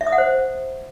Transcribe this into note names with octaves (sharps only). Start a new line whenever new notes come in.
E5
D#6
F#5
C5